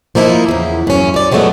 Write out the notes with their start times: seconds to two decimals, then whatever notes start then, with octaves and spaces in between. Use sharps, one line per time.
0.15 F3 A#3 D#4 E4
0.49 E2 C#3
0.87 F#2 C#4
1.14 F#2 D5
1.31 F3 F#3 G#3 A3 B3